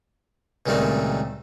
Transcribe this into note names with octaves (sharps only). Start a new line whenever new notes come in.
C#2 A#2 D#3 G3 A3 C4